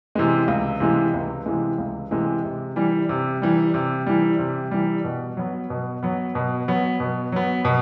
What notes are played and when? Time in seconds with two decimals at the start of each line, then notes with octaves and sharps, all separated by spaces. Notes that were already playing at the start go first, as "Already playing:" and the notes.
0.15 C3 E3 G#3
0.48 C#2
0.80 C3 E3 G#3
1.14 C#2
1.46 C3 E3 G#3
1.78 C#2
2.11 C3 E3 G#3
2.44 C3
2.76 E3 G3
3.09 C3
3.42 E3 G3
3.74 C3
4.07 E3 G3
4.39 C3
4.71 E3 G3
5.04 B2
5.37 F#3 B3
5.70 B2
6.03 F#3 B3
6.35 B2
6.68 F#3 B3
7.00 B2
7.32 F#3 B3
7.65 B2